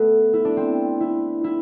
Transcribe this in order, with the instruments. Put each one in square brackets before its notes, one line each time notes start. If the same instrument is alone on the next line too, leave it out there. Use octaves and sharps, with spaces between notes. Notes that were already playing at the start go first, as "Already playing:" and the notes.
Already playing: [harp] A3 B3
E4
D4
C4
E4
E4